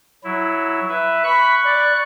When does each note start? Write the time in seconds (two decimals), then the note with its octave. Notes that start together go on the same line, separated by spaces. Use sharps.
0.24 F#3 E4
0.89 B4 E5
1.24 B5 C#6 F#6
1.64 D5